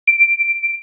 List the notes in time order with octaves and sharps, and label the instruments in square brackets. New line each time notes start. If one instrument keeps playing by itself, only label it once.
[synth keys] D7